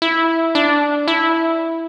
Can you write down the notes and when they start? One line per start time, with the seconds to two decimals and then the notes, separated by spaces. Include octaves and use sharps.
0.02 E4
0.55 D4
1.08 E4